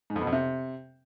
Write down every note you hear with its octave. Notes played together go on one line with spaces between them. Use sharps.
G#2
F2
B2
F2
C3